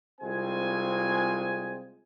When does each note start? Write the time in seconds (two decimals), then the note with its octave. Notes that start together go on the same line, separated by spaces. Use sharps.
0.21 C2 G#3 C4 F4 G#5